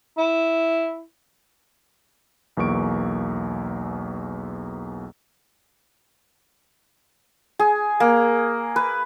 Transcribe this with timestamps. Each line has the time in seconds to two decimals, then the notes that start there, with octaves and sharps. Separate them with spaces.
0.17 E4
2.57 B1 E2 A#3 C#6 D7
7.59 G#4
8.00 A#3
8.76 B4